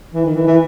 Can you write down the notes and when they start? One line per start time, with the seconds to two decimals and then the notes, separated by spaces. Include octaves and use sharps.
0.14 E3
0.25 D#3
0.35 E3
0.47 E3